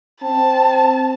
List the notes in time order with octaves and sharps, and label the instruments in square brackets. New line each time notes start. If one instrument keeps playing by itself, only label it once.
[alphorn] C4 [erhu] A5